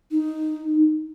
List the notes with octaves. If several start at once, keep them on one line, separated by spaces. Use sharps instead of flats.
D#4